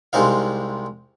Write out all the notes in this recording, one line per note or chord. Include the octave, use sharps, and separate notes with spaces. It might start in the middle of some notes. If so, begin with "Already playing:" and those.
C2 G#3 C4 D#4 F5